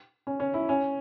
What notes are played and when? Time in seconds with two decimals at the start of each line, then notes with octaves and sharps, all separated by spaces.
0.27 C#4
0.40 C#4
0.54 E4
0.69 C#4